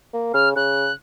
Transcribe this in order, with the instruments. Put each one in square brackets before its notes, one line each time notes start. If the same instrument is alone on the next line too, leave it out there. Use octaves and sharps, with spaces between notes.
[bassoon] A#3
[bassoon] C#3 [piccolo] F6
[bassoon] C#3 [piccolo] F#6